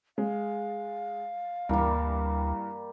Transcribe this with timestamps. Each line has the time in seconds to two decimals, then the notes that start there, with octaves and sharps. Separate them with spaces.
0.18 G#3 F5
1.69 D2 G2 E3 G3 A#3